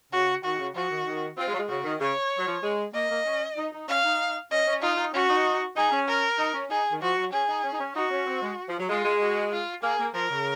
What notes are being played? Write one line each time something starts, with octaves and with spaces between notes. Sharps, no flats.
C#3 F#4
D#3 F#4
C#3
F3 F#4
D#3
D#3
C4 F4
G#3
F#3
G#3
C#3 F#4
D#3
C#3 C#5
F#3
F3
G#3
A#3 D#5
A#3
C#4
D#4
D#4
C#4 F5
D#4
C#4 D#5
C#4
D#4 F4
D#4
C#4 F#4
D#4
D#4 G#4
C#4
A#4
D#4
C#4
D#4 G#4
D#3
F3 F#4
F#3
C#4 G#4
D#4
C#4
D#4
C#4
D#4 F#4
C#4
C4
G#3
F3
F#3
G#3 F4
G#3
F#4
F4
A#3 G#4
A#3
F3 A#4
C#3